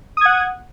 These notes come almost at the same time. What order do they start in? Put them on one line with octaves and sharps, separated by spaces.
D#6 G#6 F#5